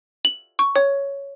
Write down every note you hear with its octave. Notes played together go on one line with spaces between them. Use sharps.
F#7
C#6
C#5